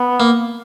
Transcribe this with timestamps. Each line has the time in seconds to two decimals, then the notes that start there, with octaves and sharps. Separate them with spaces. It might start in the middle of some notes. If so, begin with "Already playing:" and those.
Already playing: B3
0.20 A#3